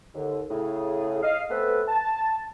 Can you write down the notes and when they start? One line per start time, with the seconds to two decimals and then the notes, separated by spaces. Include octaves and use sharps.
0.15 D#2 D3
0.50 A2 C#3 G#4
1.23 D#5 F5
1.50 A3 B3 C4 A4 B4
1.88 A5